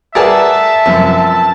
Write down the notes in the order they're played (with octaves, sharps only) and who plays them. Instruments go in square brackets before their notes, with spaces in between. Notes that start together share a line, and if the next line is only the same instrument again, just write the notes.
[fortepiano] G#4 B4 F#5 [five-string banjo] A#4 D5 G#5 [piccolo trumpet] E5 [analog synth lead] A5
[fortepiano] F#2 C3 F3 [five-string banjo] B4